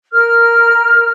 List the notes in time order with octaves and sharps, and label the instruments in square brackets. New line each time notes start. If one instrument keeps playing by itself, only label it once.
[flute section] A#4 F6